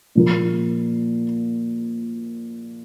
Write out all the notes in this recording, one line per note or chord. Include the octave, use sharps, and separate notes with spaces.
A#2 F3 A#3